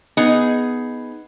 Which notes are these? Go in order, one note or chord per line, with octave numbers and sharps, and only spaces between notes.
B3 D#4 G#4